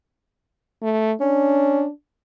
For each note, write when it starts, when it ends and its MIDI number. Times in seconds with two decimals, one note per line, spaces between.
0.82 1.13 57
1.21 1.84 61
1.21 1.90 62